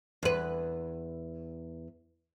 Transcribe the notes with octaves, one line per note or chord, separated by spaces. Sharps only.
E2 B4